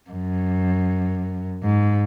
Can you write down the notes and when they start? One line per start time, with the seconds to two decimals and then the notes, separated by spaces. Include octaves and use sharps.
0.10 F#2
1.62 G#2